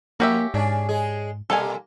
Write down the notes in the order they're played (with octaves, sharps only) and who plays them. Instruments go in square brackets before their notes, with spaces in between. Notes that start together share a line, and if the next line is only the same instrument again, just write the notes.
[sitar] F2 [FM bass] A#3 [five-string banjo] F#4 G4 E5
[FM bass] G#2 [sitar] C#4 D4 G#4
[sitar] G#3 G#4
[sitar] B2 G3 A#3 [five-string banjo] A4 F5 G#5